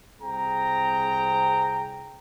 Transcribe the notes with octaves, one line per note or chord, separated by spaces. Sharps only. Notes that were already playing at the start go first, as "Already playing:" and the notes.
C2 C4 G#4 G5 A#5